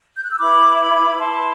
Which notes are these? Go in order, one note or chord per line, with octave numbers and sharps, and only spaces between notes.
G6
F#6
E6
E4 B4 B5 D6
B5 D6
E4 B4 A5 C6